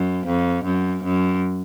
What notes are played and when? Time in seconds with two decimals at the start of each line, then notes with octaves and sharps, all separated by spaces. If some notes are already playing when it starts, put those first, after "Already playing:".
Already playing: F#2
0.26 F2
0.65 F#2
1.03 F#2